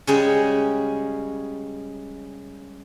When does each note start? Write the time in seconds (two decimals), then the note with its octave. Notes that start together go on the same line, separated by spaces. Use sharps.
0.07 C#3 G3 G#3 C#4 G#4